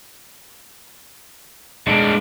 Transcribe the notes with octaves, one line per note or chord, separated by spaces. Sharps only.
A2 G#3 A#3 D4